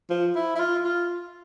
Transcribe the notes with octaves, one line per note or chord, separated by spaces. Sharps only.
F3
E4
E4
F4
F4